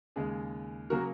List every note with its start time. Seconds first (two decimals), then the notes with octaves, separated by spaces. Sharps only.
0.16 D#2 C#3 G#3 G#4
0.90 C#3 F#3 A#3 F#4 A#4